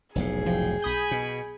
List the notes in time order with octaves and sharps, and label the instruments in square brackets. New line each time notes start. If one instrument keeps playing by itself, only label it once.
[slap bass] F1 B1 A2 [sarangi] G#4
[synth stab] F3 [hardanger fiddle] G5
[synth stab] B1 D#6 G6 [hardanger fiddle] G#5 B5
[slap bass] B2